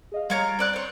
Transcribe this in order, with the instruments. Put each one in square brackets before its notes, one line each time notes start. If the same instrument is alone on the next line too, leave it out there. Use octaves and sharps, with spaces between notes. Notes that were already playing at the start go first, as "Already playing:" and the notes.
[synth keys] G#4 D#5 F5
[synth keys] G3 [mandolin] F4 C#5 A#5
[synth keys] A6 D7
[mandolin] C4 D5 F#6
C5 C#5